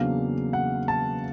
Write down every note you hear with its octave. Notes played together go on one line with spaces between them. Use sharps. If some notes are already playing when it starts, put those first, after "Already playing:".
Already playing: E2 C#3 F#3 A#3 D4 F5
F#5
A5